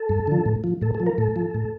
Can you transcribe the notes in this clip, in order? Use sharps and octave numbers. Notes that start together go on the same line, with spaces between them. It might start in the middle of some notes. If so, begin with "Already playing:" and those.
Already playing: A4
G2
D3 F3
A2
F3
A2 A4
A4
F3
A#4
A2 A4
F3
A2